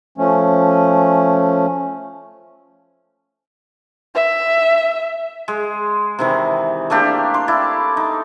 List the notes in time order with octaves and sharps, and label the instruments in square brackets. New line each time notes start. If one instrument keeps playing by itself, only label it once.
[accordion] F3 A3 C#4
[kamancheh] E5
[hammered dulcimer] G#3
C3 D#3 E3
A3 A#3 D4 G4
C6
E4 D5
D#4